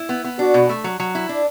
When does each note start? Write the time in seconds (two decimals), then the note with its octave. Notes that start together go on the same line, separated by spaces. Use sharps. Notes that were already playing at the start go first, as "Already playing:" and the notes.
Already playing: E4
0.09 B3
0.25 B3
0.39 D4 F#4
0.54 B2
0.69 A3
0.84 F#3
1.00 F#3
1.15 E4
1.29 D4